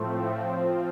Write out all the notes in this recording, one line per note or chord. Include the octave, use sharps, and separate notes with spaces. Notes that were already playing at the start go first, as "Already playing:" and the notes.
Already playing: A2 F3 A3 C4
F3 C4 F4